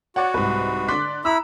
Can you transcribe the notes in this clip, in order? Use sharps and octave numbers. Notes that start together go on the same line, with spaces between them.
F#4 C#5 D5 F#5
C2 G#2 B4
D3 D5 C6 D6 F#6 B6
E4 A#5 B5 D#6 E6